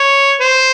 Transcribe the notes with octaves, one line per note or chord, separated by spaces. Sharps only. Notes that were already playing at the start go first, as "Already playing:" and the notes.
Already playing: C#5
C5